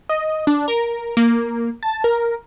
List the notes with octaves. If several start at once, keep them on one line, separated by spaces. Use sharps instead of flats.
D#5
D4
A#4
A#3
A5
A#4